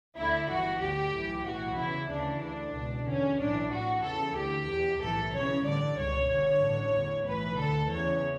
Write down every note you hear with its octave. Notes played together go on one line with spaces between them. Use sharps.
D2 D3 E4
G1 G2 E3 F#4
D2 D3 G4
B1 A2 E3
B1 A2 E3 F#4
E2 C#3 E3 E4
D2 C#3 E3 D4
D2 D3 D4
C#2 B2
E2 D3 C#4
B1 A2 E3 D4
A1 A2 E3 F#4
E2 C#3 E3 A4
D2 D3 G4
E2 B2
B1 A2 E3 A4
E2 C#3 E3 C#5
A1 G2 D3 D5
C#2 B2 C#5
G1 G2 D3 C#5
A1 G2 D3
E2 D3
B1 A2 E3 B4
D2 D3 A4
E2 C#3 E3 C#5